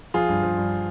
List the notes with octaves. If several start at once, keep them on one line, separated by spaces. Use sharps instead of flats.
F3 F4 G#4
G2
F3
G2